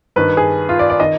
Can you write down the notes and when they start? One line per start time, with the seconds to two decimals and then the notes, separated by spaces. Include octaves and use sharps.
0.16 G2 D#3 B4
0.37 G#4
0.69 F4
0.79 D5
0.90 D5
1.00 D#3 D#5